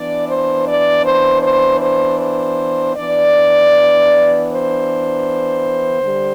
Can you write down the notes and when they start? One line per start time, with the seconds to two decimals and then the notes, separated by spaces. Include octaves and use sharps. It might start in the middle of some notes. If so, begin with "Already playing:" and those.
Already playing: E3 B3 D4 D5
0.28 C5
0.67 D5
1.05 C5
1.43 C5
1.81 C5
2.19 C5
2.96 E3 B3 D4 D5
4.49 C5
6.02 D3 G3